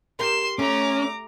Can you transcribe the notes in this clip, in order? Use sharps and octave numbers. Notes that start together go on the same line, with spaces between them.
G4 A#4 C6 E7
A3 C#4 A#5 D6